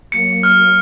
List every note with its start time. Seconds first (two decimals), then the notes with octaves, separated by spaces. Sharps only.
0.11 F#3 A#3 C#7
0.43 F6